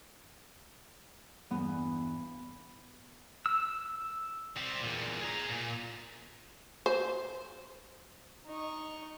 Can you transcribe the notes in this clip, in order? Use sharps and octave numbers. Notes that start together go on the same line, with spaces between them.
E2 G2 B3
E6
G3 C4
E2 A#2
G#4 A#5
A#2
C5
D#4 C#6